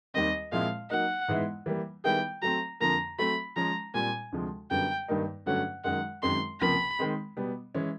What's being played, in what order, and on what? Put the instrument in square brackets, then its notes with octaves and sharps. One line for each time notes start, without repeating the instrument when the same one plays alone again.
[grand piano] D#2 D#3 G3 C4 [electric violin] D#5
[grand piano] A#2 F3 G#3 C4 E4 [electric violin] F5
[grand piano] F#3 A#3 D#4 [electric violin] F#5
[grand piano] G#2 E3 G#3 B3 E4
E3 G3 A#3
[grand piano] D#3 G3 B3 E4 G#4 [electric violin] G5
[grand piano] F#3 A3 C4 [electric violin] A#5
[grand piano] F2 D3 F3 A#3 [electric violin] A#5
[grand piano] F#3 A3 C4 [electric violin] B5
[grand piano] F3 G#3 C#4 [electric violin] A#5
[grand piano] A#2 G3 C4 F4 [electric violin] G#5
[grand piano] D2 C3 F3 G#3
[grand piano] F#2 D3 G3 B3 [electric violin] G5
[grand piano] G2 D#3 G3 A#3 D#4
[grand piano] G2 D3 F#3 A3 C#4 [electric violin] F#5
[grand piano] F#2 D#3 G#3 [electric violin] F#5
[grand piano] F#2 D#3 G#3 C4 [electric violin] C6
[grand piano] C#2 C3 F3 A#3 [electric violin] B5
[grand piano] D#3 G#3 C4
B2 G3 B3
E3 G#3 C#4